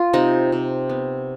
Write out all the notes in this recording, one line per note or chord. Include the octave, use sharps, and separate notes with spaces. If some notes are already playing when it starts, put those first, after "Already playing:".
Already playing: F4
C3 D#4
C3
B3